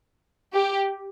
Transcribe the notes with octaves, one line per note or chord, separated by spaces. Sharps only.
G4